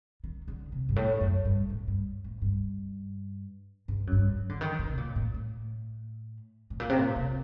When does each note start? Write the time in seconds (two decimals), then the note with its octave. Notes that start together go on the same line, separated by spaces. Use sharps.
0.24 D#3
0.48 D3
0.72 C3
0.89 G2
0.96 A2
1.21 F#2
1.45 G2
1.69 A2
1.88 G2
2.24 A2
2.42 G2
3.88 G2
4.07 F#2
4.12 G2
4.37 F#3
4.49 D3
4.61 D#3
4.79 D3
4.89 C3
4.97 A#2
5.16 A2
5.34 A2
6.70 A2
6.80 A#2
6.89 C3
6.98 A#2
7.16 C3